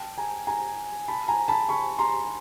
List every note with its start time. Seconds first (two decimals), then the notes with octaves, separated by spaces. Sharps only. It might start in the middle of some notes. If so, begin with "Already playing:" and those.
Already playing: G5 A5
0.18 G#5 A#5
0.47 G#5 A#5
1.08 A5 B5
1.28 G#5 A#5
1.48 A5 B5
1.69 B5 C#6
1.99 A#5 C6